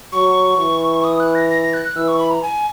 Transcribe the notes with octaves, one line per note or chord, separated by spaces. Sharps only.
F#3 C#6
E3
D#6
F#6
A#6
A#6
A#6
F#6
F#6
E3 E6
C#6
B5
A#5
G#5